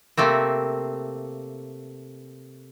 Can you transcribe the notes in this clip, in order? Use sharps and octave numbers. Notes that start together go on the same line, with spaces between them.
C3 A3 A#3 C4